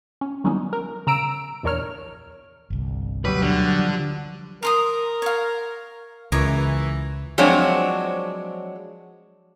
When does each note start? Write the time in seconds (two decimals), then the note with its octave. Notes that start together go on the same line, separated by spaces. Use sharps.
0.21 C#4
0.44 D#3 F#3 G3 B3 C#4 D#4
0.73 A#4
1.07 C#3 A#5 E6 D7
1.63 A#1 E2 D4 A#4 C#5 F6
2.70 G1 C2
3.25 D2 B2 F#3 G3 B4
3.42 D3
3.79 F3
4.63 A#4 A#5 C6 D#6
5.22 C#5 F5
6.32 C#2 E3 A#4 C#5 D6
7.38 F3 F#3 G#3 C4 D4 C#5